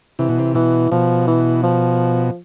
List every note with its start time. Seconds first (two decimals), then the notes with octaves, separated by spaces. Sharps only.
0.19 C3 E3
0.29 B2
0.39 C3
0.55 B2 E3
0.91 B2 F3
1.27 E3
1.63 F3